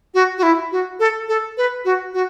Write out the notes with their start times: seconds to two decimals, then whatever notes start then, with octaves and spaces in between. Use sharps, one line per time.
0.14 F#4
0.38 F#4
0.43 E4
0.72 F#4
1.00 A4
1.29 A4
1.57 B4
1.85 F#4
2.14 F#4